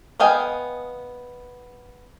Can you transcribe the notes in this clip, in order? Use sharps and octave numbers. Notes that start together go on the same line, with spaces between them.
B3 D#5 F5 G5 G#5